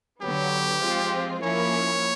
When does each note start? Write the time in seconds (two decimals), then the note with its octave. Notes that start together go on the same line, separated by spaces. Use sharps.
0.22 D3 F#3 B3 G4
0.82 F3 G#3 C4 F4
1.43 F3 A#3 C#4 E4 C#5